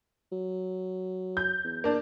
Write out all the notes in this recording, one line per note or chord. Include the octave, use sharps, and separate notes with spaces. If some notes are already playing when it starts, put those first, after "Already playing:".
F#3
G6
E2
A#3 D4